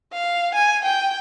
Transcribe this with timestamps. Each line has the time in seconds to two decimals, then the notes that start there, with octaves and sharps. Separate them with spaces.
0.13 F5
0.55 G#5
0.84 G5